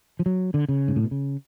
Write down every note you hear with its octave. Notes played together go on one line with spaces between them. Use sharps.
F3
F#3
D3
C#3
G#2
A2
B2
C#3